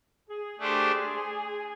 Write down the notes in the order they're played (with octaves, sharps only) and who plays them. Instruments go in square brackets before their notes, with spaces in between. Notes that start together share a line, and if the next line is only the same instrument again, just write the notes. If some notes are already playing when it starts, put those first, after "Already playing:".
[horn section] G#4
[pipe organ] A3 D4 G4 C5